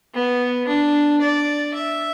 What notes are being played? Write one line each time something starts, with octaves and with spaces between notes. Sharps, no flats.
B3
D4
D5
E5